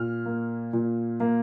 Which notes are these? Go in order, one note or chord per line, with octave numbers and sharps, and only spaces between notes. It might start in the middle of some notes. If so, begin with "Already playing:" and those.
Already playing: A#2 F6
A#3
A#2
A#3